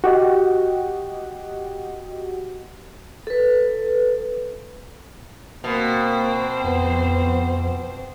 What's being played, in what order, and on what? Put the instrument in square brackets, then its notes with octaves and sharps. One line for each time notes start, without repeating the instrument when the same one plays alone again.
[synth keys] F#4 G4 D#5 F#5
[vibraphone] A4 B4
[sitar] B2 [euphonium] A#3 [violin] C4 C5
[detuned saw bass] F2 [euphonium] B3